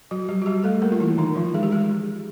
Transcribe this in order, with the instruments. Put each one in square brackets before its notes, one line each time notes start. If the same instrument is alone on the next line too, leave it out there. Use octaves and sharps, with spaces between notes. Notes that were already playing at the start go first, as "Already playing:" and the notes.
[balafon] F#3 F#4
G3 G4
F#4
G3 G4
A3 A4
A#3 A#4
F4
E3 E4
D#3 D#4
F3 F4
G#3 G#4
G4
G#3 G#4